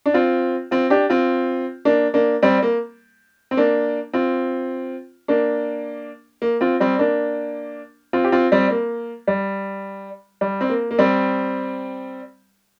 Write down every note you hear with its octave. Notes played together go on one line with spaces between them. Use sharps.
D4
C4 F4
C4 F4
D4 G4
C4 F4
A#3 D4
A#3 D4
G3 C4
A#3
C4
A#3 D4
C4 F4
A#3 D4
A#3
C4 F4
G3 C4
A#3 D4
C4 F4
G4
C4 F4
G3 C4
A#3
G3
G3
C4
A#3
A#3
G3 C4